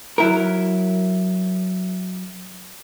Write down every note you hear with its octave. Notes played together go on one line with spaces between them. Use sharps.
F#3 E4 A#4